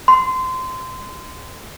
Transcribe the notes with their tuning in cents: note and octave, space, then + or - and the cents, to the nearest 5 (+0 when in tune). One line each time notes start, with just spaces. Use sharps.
C6 -20